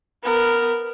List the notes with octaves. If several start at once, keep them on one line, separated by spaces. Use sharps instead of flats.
B3 A#4